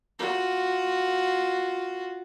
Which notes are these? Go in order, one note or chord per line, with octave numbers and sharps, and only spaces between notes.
F4 F#4